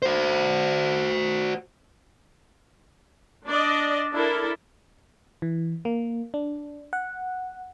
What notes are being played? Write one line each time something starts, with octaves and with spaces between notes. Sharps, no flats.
F#4 C5
D4 D5 D#5
D4 E4 A4 A#4
E3
A#3
D4
F#5